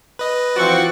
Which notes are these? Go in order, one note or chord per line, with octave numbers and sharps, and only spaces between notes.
B4 D#5
E3 F3 C4 F#4 F#5 C#6 D6 A6